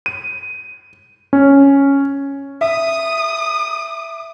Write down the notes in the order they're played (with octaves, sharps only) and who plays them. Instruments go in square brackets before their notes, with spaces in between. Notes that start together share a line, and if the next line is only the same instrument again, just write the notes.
[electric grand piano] D#7
C#4
[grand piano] E5 [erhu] D#6